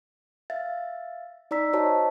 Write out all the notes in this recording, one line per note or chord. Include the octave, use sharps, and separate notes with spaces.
E5 F5 A6
D#4 D5 A#5 E6 B6
F#4 C5 C#5 D#5 A5